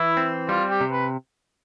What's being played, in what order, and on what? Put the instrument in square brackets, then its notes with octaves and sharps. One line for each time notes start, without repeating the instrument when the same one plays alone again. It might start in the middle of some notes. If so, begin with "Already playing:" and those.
Already playing: [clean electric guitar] E3 [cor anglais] E4
[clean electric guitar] C4
[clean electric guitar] G3 [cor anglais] F4
[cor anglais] G4
[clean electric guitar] C3
[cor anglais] B4